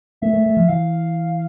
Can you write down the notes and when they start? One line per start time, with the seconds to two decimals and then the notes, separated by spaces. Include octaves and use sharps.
0.22 A3 E5
0.33 A3
0.46 A3
0.57 F3
0.68 E3 F5